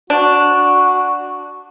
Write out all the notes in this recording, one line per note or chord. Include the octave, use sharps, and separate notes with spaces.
D4 F#4